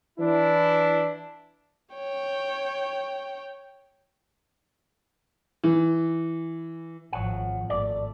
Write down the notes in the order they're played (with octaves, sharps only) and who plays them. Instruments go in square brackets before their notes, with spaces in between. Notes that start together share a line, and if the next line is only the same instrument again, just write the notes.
[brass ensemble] E3 D4 E4
[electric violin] C#5 G5
[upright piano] E3
[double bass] G#1 F3 [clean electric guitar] C#5 F#5
[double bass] G#1 A3 [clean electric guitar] D5